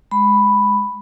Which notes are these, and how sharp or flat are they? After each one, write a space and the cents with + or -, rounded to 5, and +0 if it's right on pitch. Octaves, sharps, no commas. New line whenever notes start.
G#3 +0 B5 +0